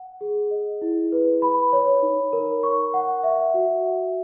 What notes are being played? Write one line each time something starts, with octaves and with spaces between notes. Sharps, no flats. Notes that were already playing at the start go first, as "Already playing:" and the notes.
Already playing: F#5
G#4
D#5
E4
B4
B5
C#5
D#4
A#4
C#6
F#5
E5
F#4
E5